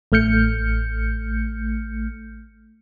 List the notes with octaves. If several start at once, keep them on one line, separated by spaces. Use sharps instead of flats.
A1 A3 F6 G6 C#7